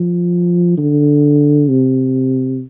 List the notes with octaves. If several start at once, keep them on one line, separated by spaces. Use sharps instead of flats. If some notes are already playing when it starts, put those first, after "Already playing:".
Already playing: F3
D3
C3